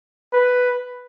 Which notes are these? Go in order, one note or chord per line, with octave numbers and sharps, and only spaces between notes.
B4